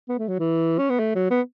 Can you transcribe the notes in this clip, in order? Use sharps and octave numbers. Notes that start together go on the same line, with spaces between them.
B3
A3
F#3
E3
C#4
B3
A3
F#3
B3